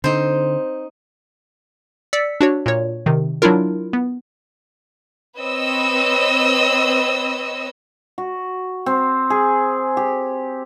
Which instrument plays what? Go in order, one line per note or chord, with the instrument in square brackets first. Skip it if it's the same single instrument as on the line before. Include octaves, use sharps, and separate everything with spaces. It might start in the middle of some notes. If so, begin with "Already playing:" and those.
[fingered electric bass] D3 [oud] C4 [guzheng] D#4 C5
[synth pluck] D5 E6 B6 C#7
D4 F#4 C#5
A#2 C#5
C3 D#3
F#3 D4 E4 F4 A#4
B3
[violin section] C4 B4 C#5 D#5 E6
[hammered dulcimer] F#4
C4
G#4
G4